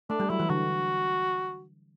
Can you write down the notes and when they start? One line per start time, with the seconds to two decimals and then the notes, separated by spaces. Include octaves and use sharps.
0.10 A3 D4
0.20 G3
0.30 F#3 E4
0.40 E3
0.50 D3 F#4